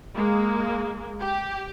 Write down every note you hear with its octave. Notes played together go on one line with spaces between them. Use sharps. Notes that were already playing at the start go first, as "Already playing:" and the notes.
G#3 A#3
G4